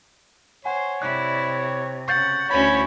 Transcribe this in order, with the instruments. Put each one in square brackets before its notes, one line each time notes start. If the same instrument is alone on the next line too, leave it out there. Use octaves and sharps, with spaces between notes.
[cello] C5 [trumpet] C#5 [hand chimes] F#5 G#5
[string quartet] C3 [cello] E4 D5 [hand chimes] F#6
[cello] C#3 F#5 [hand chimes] C#6 G6 A6
[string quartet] D2 C#4 B5 [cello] E4 F#4 [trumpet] C#5